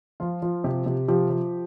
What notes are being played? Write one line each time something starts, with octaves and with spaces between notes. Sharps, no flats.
F3 F4
F3
C3 G4
C3
F3 G4
F3